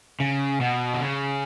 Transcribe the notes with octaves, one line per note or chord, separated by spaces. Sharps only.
C#3
B2
D3
C#3